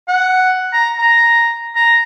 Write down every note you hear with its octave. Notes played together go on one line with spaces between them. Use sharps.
F#5
A#5
A#5
A#5